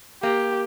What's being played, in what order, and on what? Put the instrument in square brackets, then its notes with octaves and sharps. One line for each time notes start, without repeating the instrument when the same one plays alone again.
[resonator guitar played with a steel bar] A#3 [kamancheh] G4